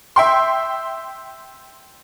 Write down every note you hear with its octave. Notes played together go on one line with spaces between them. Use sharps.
E5 G5 C6